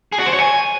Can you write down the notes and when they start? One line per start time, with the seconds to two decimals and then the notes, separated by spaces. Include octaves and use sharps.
0.12 G#4
0.19 F#4
0.26 C5
0.33 C#5
0.40 G#5